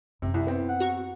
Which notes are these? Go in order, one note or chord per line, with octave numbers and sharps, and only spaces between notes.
F#2 C3 D#4
C2 E4
B3 C4
F#5
F#4 A#5 C#6